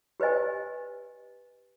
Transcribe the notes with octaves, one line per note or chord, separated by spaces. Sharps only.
G4 B4 C5 D#5 G#5